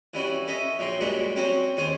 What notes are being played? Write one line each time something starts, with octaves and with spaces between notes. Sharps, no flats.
E3 G3 C#4 F#4
C#4 A4 D#5 E5
A#1 F#3 G5 C6
A#2 G3 G#3 C#4 F#4
F#3 C4 C#4 F#4 C5
D#2 C#4 G#4 C5